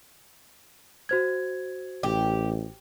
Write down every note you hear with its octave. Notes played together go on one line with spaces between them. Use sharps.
F#4 C5 G#6
A1 G4